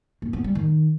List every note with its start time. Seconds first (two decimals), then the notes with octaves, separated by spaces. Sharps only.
0.22 A#3
0.33 B3
0.44 G3
0.55 D#3